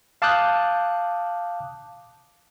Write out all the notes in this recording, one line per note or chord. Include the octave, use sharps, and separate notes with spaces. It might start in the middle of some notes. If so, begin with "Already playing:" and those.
F5 A5 D6 D#6 F#6 G6